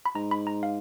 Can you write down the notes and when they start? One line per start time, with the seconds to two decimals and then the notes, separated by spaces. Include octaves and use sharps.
0.06 B5
0.15 G#2 A#5
0.31 B5
0.47 A#5
0.63 F5